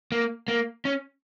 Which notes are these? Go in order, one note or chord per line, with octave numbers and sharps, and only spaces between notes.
A#3
A#3
C#4